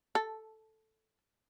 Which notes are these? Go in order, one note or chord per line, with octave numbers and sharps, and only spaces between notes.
A4